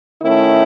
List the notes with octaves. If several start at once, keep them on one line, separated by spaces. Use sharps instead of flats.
D#3 A3 C#4 E4